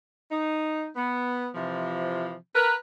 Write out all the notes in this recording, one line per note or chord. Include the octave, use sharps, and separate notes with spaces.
D#4
B3
C3 E3 F3
A#4 B4